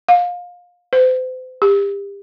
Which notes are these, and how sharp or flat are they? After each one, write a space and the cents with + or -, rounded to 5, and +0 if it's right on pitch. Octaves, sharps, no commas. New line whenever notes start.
F5 +25
C5 -40
G4 +30